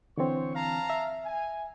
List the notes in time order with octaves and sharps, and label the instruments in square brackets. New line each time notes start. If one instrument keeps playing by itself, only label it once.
[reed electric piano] D3 E3 C4 [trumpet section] C5 C#5 C#6
[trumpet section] F5 A5 A#5
[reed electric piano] E5
[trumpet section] G#5